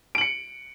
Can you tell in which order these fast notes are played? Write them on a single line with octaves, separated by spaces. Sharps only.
D7 F#7 C#7